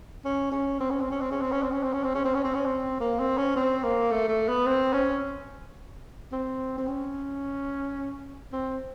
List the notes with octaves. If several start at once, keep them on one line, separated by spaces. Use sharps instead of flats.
C#4
C#4
C4
C#4
C4
C#4
C4
C#4
C4
C#4
C4
C#4
C4
C#4
C4
C#4
C4
C#4
C4
C#4
C4
A#3
C4
C#4
C4
A#3
A3
A3
B3
C4
C#4
C4
C4
C#4
C4